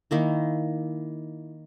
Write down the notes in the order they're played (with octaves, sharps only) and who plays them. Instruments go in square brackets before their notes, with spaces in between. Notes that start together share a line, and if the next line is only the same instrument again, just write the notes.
[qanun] D#3 A#3 E4